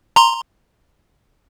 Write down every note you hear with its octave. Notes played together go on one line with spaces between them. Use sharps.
A#5 C6